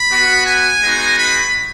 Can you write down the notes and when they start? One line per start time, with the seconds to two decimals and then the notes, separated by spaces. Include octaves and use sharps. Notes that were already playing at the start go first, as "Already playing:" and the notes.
Already playing: B5
0.09 B3 F#4
0.46 G#5
0.82 G#3 B3 D#4 F#4
1.18 B5